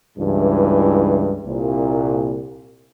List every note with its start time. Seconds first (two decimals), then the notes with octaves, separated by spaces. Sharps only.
0.18 C#2 G2 E3
1.45 C2 A#2